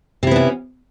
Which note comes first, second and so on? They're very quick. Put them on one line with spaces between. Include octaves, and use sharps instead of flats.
C3 E4 B3 D4 C#4